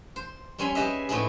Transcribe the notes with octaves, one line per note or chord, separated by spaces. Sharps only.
C5
G3 C4 C#4 G#5 B5 C6
G4 G#4 B4 D#5 E5
A2 B3 C4 D#4 E4 G#4